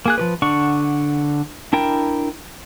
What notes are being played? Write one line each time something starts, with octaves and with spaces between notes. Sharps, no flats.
A#3 G#4 F#6
F3 G4 B4
D3 D4 F#5 C#6
D4 E4 A#4 G5